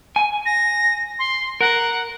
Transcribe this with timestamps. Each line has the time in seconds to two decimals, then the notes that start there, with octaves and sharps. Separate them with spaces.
0.16 G#5
0.46 A#6
1.19 C6
1.61 A#4 F#5